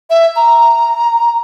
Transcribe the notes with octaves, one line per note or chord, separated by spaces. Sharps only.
E5
A#5